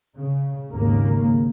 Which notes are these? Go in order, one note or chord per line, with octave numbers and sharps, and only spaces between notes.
C#3
G#1 D#2 C#3 A#3